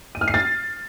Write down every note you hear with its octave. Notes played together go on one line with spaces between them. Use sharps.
D#7
F6
C7
A6